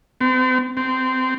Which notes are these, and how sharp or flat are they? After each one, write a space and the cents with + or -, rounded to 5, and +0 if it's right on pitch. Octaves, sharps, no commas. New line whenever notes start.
C4 -40
C4 -20